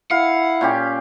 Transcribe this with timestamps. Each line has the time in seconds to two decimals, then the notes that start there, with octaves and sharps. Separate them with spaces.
0.11 E4 F5 F#5
0.61 A#2 C#4 G4